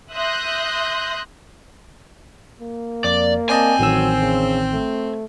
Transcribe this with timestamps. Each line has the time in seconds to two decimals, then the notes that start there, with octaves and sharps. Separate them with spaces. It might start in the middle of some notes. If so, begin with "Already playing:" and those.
0.13 E5 C6 D#6 F#6 G6 A#6
2.61 A#3
3.04 F2 D5
3.49 C4 D5 D#5 G#5 A5
3.79 A1 D#3 F#3 E6
4.20 C#3
4.73 A3